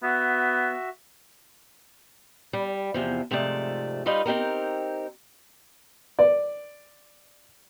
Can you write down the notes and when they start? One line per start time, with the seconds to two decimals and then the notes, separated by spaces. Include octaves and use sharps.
0.03 B3 F#4 E5
2.53 G3
2.94 E2 C3 F3
3.31 G#2 C3 F3 A3 D5
4.06 G3 D#4 F4 B4 D#5
4.26 C4 D#4 G4 A#4
6.19 D5